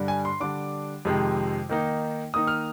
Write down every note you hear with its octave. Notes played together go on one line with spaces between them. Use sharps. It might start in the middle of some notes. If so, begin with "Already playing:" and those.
Already playing: G2 D3 G3 D4
G#5
C6
D3 G3 D4 D6
F2 C3 D#3 G#3
D#3 A#3 D#4
D#3 A#3 D#4 D#6
F6